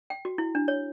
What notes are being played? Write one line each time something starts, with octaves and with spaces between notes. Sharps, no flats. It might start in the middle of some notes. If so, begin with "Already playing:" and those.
G5
F#4
E4
D4
C#5